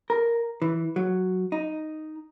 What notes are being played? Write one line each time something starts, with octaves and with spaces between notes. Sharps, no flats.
A#4
E3
F#3
D#4